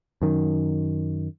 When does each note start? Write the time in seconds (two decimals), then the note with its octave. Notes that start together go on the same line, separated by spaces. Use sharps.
0.22 F#2 D#3